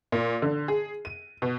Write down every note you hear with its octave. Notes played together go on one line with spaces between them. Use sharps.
A#2
D3
G#4
D#7
B2